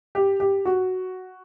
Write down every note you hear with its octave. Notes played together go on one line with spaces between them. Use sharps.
G4
G4
F#4